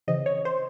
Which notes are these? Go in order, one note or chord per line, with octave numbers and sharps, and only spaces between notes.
C#3 E3 C4 D#5
C#5
C5